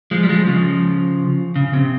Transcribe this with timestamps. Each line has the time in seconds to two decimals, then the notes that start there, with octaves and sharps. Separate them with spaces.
0.11 F3 G#3
0.23 G3
0.29 F3 G#3
0.47 C#3 F3
1.56 C#3
1.73 C3